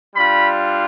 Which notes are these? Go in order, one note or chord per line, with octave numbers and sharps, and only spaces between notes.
G3 D4 F4 B5